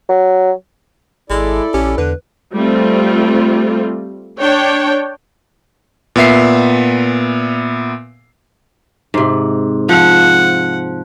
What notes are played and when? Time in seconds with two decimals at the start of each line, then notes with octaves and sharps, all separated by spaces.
0.09 F#3
1.30 G#1 G#3 E4 A4 D5
1.74 A#1 C#4 G4
1.98 E2 D3 B4
2.54 G3 A3 C4 F4
4.39 D4 C#5 G5
6.16 A#2 B3 E5 C7
9.14 G#2 C3
9.89 F3 F#5